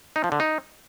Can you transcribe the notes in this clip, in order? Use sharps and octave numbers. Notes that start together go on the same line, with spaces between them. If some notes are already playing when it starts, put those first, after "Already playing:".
D#4
F3
D3
D#4